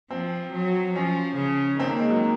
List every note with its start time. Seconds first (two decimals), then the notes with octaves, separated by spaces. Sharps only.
0.11 F3 C4
0.53 F#3
0.94 F3 C#4
1.37 C#3
1.80 D#3 C4
1.89 A#3
2.00 G#3
2.10 F#3